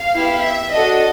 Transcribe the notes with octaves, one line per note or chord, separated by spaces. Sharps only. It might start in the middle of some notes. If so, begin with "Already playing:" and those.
Already playing: F5
B3 E4 G4
E5
D4 F#4 A4 D#5